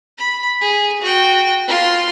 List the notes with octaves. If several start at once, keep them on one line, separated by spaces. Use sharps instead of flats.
B5
G#4
F#4 G5
F4 C6